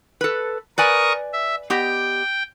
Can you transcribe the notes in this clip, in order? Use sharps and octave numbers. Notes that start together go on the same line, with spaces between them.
A4 B4
A#4 B4 D5 G#5 C#6 D#6
E5
B3 G4 D#5 G5